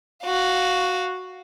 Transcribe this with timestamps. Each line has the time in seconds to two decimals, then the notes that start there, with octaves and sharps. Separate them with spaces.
0.24 F#4 F5